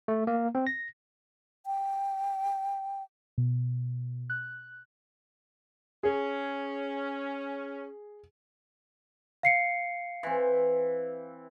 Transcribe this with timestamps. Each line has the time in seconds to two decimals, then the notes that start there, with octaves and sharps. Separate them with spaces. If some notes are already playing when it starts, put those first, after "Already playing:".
0.08 A3
0.27 A#3
0.55 C4
0.67 A#6
1.66 G5
3.38 B2
4.30 F#6
6.03 C#4 G#4
9.43 F5 C7 C#7
10.23 E3 C4